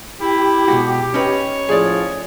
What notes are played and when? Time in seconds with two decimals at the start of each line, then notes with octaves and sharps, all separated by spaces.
0.21 E4 G4
0.68 B2 G#3 F#4
1.14 C#4 D#4 B4 C#5
1.69 A2 F3 G#4 D5